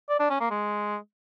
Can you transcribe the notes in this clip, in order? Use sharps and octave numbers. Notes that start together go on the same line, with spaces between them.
D5
D4
C#4
A#3
G#3